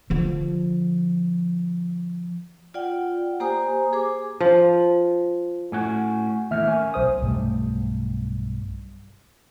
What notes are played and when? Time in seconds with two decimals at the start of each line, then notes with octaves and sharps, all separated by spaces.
0.10 D3 F3
2.74 F4 D5 F#5 G5
3.40 A#3 G4 C5 G#5 A#5 D#6
3.93 G#4 C5 G#5 D6
4.40 F3
5.72 A2 C#4 F#4
6.51 D#2 A2 E5 F6
6.64 A#3 C#4
6.94 B1 C5 D#6
7.22 B1 G2 G3 A3